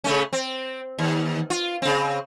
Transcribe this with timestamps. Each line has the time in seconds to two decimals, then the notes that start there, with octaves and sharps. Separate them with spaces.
0.04 C#3 A3 C#4
0.33 C4
0.99 D#2
1.50 F4
1.82 C#3 C4